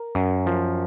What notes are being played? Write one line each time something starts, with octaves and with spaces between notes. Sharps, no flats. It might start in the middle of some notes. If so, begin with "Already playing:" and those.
Already playing: A#4
F#2
F3